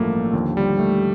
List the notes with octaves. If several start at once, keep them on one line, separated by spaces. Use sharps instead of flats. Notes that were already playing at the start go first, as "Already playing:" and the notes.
Already playing: A1 G2 F3 A3 A#3
D#2 D3 F3
G3
A3